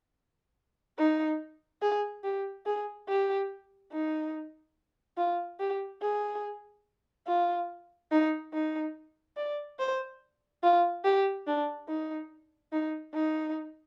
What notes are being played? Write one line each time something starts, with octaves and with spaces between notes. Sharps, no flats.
D#4
G#4
G4
G#4
G4
D#4
F4
G4
G#4
F4
D#4
D#4
D5
C5
F4
G4
D4
D#4
D#4
D#4